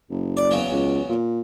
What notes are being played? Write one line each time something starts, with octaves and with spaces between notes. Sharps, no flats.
F#1
D5
E2 C#3 F#3
C#2
A#2